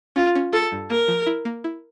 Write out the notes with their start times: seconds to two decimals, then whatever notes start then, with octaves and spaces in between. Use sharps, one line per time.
0.16 C#4 F4
0.35 C#4
0.53 F4 A4
0.72 G2
0.90 A#3 A#4
1.08 F3
1.26 E4
1.45 A#3
1.64 E4